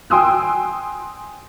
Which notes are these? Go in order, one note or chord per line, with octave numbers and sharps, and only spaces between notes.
G5 G#5 C6 D#6 E6 F#6